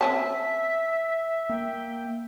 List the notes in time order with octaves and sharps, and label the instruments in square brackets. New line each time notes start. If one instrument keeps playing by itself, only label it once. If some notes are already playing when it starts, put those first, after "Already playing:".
[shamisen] C4 C#4 A5 [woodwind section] E5 [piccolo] B6
[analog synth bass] A#3 [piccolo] G5